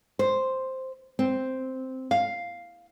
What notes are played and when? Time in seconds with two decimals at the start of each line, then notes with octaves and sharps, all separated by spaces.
0.19 C5
1.19 C4
2.11 F5